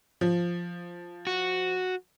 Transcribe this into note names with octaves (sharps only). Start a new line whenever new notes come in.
F3
F#4